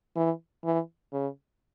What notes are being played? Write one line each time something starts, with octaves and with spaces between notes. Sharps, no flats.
E3
E3
C#3